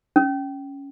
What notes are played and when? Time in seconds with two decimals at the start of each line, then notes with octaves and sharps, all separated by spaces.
0.16 C#4